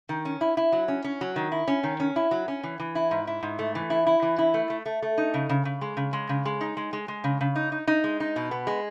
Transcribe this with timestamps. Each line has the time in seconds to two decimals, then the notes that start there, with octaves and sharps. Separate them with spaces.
0.09 D#3
0.25 C#4
0.41 E4
0.57 E4
0.72 F#3
0.88 C#4
1.04 C#4
1.21 F#3
1.36 D#3
1.52 E4
1.68 C#4
1.83 D#3
2.00 C#4
2.16 E4
2.31 F#3
2.48 C#4
2.63 E3
2.80 E3
2.95 E4
3.11 G#2
3.27 E4
3.43 G#2
3.59 A3
3.75 E3
3.90 E4
4.07 E4
4.22 E3
4.38 E4
4.54 A3
4.70 A3
4.86 A3
5.02 A3
5.18 D#4
5.34 C#3
5.49 C#3
5.65 C#3
5.81 G#3
5.97 C#3
6.13 G#3
6.29 C#3
6.45 G#3
6.61 D#4
6.77 G#3
6.93 G#3
7.08 G#3
7.24 C#3
7.41 C#3
7.56 D#4
7.72 D#4
7.87 D#4
8.04 G#3
8.20 D#4
8.36 B2
8.51 B3
8.67 G#3